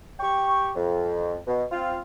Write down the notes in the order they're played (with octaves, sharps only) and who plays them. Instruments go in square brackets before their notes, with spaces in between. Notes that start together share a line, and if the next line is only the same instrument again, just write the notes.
[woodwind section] G4 G5 C#6
F2
B2
C4 F4